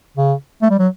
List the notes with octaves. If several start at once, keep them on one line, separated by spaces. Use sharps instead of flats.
C#3
A3
G3
F#3